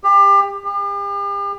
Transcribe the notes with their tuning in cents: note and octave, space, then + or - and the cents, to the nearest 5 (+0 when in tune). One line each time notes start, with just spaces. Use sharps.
G4 +30
G4 +40